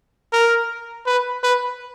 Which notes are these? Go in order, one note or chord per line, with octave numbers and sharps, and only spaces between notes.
A#4
B4
B4